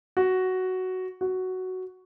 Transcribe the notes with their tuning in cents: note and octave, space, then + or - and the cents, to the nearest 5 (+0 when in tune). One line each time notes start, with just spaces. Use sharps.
F#4 +5
F#4 +5